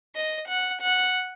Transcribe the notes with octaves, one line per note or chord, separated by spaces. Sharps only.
D#5
F#5
F#5